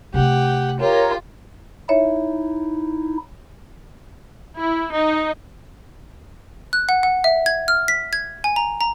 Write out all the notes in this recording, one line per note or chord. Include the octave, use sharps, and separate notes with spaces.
C3 A3 G4 F#5
F4 G4 A#4 C#5
D#4 E4 C#5 E5
E4
D#4
F#6
F#5
F#5
E5
G#6
F6
B6
G#6
G#5
A#5
A#5